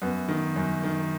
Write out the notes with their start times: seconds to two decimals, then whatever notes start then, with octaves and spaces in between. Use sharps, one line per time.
0.02 F#2 B3
0.28 D#3
0.56 F#2
0.83 D#3